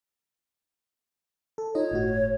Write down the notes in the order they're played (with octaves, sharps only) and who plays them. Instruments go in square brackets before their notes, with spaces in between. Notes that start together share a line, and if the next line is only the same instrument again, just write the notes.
[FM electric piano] A4
[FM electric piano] D#4 F4 D#5 [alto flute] C#5
[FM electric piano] G1 A2 F#4